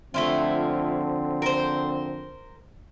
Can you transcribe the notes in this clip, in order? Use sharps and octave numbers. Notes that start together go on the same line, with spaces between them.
D3 F3 A3 C4 E4 F4
A#4 C5